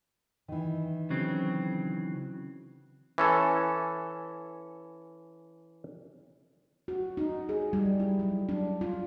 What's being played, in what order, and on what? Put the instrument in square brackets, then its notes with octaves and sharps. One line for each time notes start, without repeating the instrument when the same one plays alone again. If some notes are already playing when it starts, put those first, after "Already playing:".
[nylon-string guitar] D#3 E3
[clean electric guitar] C#3 F#3 C4
[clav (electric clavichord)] E3 C#4 A4
[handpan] F#4
D#4
G#4
G3
E4
F#3
D4
F4